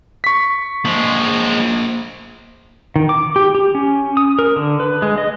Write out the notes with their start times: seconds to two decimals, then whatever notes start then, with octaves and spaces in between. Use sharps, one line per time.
0.24 C#6 B6
0.85 F3 G#3 A#3 C5
2.96 D#3
3.09 D6
3.36 G4
3.55 G4
3.75 C#4
4.17 D#6
4.39 A#4
4.56 D3
4.80 B4
5.02 G#3
5.18 D#5